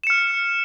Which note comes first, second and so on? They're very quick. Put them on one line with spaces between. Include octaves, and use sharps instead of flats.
E7 C#7 F6